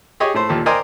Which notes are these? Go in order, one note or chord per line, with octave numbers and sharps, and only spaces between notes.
G4 G#4 C#5 D#5
A2 A3 C5
D#2 A#2 G4 A4
A#4 C5 D5 D#5 G5 G#5